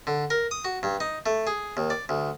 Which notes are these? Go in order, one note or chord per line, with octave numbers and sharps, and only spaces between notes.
D3
A#4
D#6
F#4
G2
D#4
A3
G#4
D#2
D5
D2